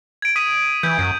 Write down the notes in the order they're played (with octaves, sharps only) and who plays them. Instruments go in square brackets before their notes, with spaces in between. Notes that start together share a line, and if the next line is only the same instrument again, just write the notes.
[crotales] G#6 D7
D#6 B6 D#7
[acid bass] E3 [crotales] G6
[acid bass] F#2